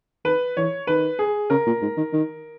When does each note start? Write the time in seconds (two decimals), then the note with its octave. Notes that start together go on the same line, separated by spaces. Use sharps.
0.25 D#3 B4
0.57 E3 C#5
0.87 D#3 B4
1.19 G#4
1.50 C#3 A#4
1.67 A#2
1.82 G#2
1.97 D#3
2.13 D#3